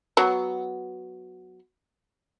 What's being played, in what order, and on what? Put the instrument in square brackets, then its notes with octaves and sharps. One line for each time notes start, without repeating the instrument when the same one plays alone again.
[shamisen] F#3 B3